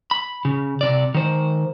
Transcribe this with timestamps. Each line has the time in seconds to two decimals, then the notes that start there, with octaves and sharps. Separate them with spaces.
0.11 B5
0.45 C#3
0.81 C3 D5
1.15 D#3 C5